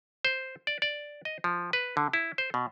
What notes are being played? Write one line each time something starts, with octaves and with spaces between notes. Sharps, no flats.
C5
D5
D5
D#5
F3
B4
D3
E4
C5
B2